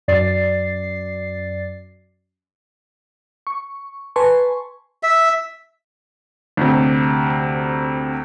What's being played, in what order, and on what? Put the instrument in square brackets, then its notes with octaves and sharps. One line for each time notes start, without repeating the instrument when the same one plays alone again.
[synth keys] F#2 D5 A6 C7
[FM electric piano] C#6
B4 G#5 A5 C6 C#6
[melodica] E5
[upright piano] D2 C3